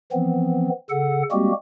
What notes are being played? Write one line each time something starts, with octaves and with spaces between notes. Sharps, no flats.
E3 F3 B3 C4
C#3 A4 F#5
G3 G#3 A#3 C4 F#4 G4